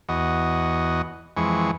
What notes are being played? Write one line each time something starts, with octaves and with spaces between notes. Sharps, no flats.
E2 F#4 D#5
F2 E3 G#3 C#6